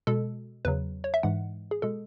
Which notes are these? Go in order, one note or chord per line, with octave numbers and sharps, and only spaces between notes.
B2 G#3 A4
E2 C#3 F#3 B4
C#5
E5
G#2 E3 G#3 F#5
G#4
B2 G#3 A4